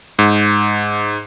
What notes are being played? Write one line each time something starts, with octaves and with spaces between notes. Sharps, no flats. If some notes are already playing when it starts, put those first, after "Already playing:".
G#2